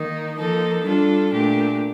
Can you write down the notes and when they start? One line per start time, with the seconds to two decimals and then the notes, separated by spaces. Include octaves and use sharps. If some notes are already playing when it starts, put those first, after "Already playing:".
Already playing: D#3 A#3 D#4
0.38 F3 A#3 D#4 A4
0.85 G3 D4 F4 A4
1.32 A#2 A3 D4 G4